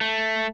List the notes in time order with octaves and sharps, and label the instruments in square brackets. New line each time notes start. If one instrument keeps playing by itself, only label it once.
[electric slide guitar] A3